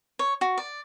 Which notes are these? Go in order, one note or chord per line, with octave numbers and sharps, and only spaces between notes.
C#5
F#4
D5